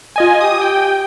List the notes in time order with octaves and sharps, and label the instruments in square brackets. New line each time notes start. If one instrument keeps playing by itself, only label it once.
[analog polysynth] F4 D#5 G#5
[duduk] G4 [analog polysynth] D#6
[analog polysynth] G5